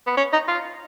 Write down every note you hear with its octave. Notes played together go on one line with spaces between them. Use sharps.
B3
C#4
D#4
F4